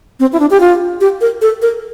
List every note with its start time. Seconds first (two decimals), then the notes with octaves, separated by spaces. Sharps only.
0.20 C4
0.33 E4
0.40 D4
0.50 G4
0.60 F4
1.01 G4
1.21 A#4
1.42 A4
1.62 A#4